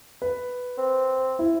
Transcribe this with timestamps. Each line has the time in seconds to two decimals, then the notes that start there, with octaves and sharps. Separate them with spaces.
0.22 B4
0.78 C4
1.39 E4